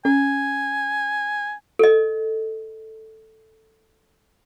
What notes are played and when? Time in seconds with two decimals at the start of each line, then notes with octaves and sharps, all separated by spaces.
0.05 C#4 G#5
1.79 A4 D#5